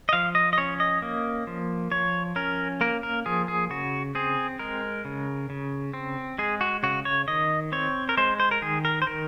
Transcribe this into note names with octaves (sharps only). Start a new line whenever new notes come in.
D#5
F3 F5
D#5
D#5
C#4 C#5
D#5
A#3
F3
F3 C#5
C#4 A#4
A#3 A#4
A#4
F3 G#4
G#4
C#3 F#4
C4 G#4
G#3 A#4
C#3
C#3
C4
G#3 G#4
F#4
C#3 F#4
C#5
D#3 D#5
C4 C#5
A#4
G#3 C5
C5
A#4
D#3 G#4
A#4
C5
D#3 A#4